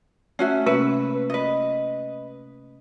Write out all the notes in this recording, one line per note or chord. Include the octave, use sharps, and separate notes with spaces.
A3 C#4 F#4 E5 F#6
C3 A#3 C#4 B4
B4 D#5